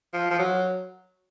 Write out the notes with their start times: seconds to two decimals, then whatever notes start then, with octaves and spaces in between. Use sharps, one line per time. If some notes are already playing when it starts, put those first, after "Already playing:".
0.13 F3
0.30 F3
0.39 F#3